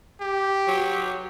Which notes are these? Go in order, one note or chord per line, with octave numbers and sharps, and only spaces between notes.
G4
F#3